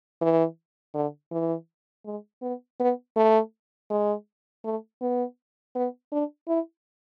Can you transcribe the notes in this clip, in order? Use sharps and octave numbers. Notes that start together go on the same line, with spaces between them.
E3
D3
E3
G#3
B3
B3
A3
G#3
A3
B3
B3
D4
E4